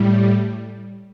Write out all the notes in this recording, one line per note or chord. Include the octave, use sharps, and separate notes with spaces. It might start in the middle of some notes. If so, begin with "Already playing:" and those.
Already playing: A2 G3